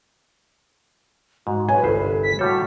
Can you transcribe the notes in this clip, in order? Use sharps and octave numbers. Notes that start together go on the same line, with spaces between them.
G#2 F#4
B4 C#5 G#5
G1 C2 A4 C5
B6
A2 G3 F#4 A4 C#5